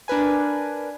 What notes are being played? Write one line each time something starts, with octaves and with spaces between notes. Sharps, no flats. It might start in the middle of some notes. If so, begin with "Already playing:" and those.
D4 A#4 B4 G#5